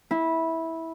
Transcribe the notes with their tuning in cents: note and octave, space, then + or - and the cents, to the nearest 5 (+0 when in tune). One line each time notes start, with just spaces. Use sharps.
E4 -15